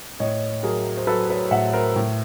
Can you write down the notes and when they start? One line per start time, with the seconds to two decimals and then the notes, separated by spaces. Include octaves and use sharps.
0.20 A2 C#5 D#5
0.63 F#3 G#4 A#4
0.97 C5
1.07 F#3 A4 B4
1.30 B4 C#5
1.51 A2 E5 F#5
1.73 A#4 C5
1.96 A2